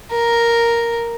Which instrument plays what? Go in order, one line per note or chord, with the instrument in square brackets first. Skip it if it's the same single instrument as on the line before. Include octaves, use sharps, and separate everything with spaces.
[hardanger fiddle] A#4